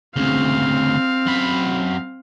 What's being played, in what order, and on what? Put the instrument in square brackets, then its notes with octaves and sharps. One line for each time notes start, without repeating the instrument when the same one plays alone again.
[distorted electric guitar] D2 C#3 [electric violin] C4 F5
[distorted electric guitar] F#2 B5